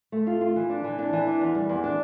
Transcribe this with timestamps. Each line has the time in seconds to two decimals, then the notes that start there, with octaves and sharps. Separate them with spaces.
0.12 A3
0.27 F4
0.41 F4
0.56 E3
0.70 D4
0.84 E3
0.99 D4
1.13 E3
1.27 D4
1.41 E2
1.55 G3
1.69 E2
1.84 D4